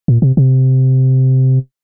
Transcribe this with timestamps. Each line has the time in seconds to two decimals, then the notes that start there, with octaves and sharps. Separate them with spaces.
0.08 A#2
0.22 C3
0.37 C3